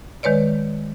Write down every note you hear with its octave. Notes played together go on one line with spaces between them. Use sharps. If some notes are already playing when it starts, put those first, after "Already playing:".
D#3 G#3 B4 C#5 D5